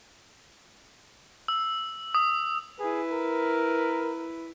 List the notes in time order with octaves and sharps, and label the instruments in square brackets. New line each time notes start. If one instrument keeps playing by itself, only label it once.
[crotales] E6
D#6
[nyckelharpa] E4 B4 [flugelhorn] G#4
[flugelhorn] A#4